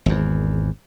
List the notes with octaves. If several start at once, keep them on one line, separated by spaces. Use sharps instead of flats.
G#1 E2